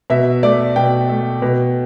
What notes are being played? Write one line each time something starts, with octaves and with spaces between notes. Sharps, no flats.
B2 E5
A3 D5
B2 G5
A3
B2